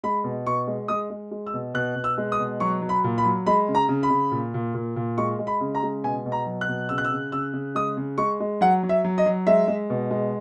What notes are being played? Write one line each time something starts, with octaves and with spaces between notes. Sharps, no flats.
G#3 B5
B2
B2 C#6
G#3
G#3 D#6
G#3
G#3
E6
B2
B2 F#6
B2
E6
G#3
D#6
B2
F#3 C#6
F#3
B5
A#2
B5
F#3
G#3 B5
C#3
A#5
C#3
B5
C#3
A#2
A#2
A#2
A#2
G#3 C#6
G#3
B5
C#3
A#5
G#3
B2 G#5
B2
A#5
F#3
F#6
B2
C#3 E6
F#6
E6
C#3
C#3 E6
C#3
G#3 D#6
C#3
G#3 C#6
G#3
F#3 F#5
F#3
E5
F#3
D#5
F#3
G#3 E5
G#3
B2
G#3